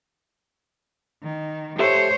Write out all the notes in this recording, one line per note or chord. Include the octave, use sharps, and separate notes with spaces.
D#3
G4 A4 C5 C#5 E5